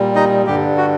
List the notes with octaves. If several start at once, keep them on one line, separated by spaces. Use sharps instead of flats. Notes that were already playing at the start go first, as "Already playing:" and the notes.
Already playing: A#2 G3
D#4 D#5
G2 D3 G3 G4
F#4